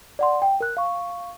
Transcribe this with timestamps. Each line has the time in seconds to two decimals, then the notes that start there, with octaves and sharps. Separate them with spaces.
0.19 D5 F#5 C6
0.42 G5
0.60 A#4 F#6
0.77 F5 C#6